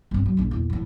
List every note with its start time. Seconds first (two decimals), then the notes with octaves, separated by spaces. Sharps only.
0.11 G1 C4
0.26 F#3
0.37 A#1 D4
0.51 E2 A#2
0.70 A2 F3